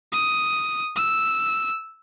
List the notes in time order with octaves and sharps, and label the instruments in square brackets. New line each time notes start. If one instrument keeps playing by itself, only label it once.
[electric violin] D#6
E6